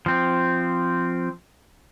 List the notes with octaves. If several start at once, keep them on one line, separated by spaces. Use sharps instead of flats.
F3 C4